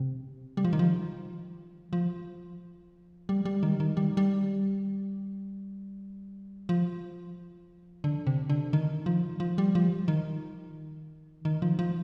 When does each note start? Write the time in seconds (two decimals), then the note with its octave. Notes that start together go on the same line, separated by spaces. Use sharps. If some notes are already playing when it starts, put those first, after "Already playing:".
Already playing: C3
0.57 G3
0.65 F3
0.73 D#3
0.79 F3
1.93 F3
3.29 G3
3.45 G3
3.63 D#3
3.80 D#3
3.97 G3
4.17 G3
6.69 F3
8.04 D3
8.27 C3
8.50 D3
8.73 D#3
9.06 F3
9.40 F3
9.58 G3
9.75 F3
10.08 D#3
11.45 D#3
11.62 F3
11.79 F3